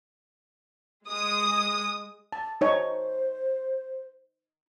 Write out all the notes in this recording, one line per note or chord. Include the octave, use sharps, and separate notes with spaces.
G#3 D#6
A5
D#4 C5 C#5